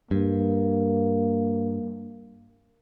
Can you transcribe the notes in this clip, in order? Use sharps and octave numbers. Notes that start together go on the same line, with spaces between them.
G2 A#3